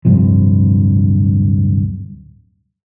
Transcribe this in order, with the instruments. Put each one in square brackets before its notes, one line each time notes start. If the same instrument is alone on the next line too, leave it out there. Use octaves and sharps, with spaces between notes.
[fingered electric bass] D1 G2 C3 F3